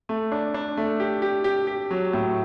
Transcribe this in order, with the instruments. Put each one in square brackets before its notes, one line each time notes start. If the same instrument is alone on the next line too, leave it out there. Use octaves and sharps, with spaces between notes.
[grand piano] A3
D4
D4
A3
G4
G4
G4
G4
F#3
A2